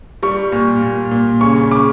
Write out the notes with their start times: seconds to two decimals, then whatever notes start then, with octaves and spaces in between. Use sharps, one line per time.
0.23 G3 C#6
0.52 A#2
0.82 A#2
1.11 A#2
1.41 C#3 C#6
1.71 C#3 D6